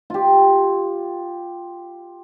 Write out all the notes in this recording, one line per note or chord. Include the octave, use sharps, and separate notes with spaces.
F4 G4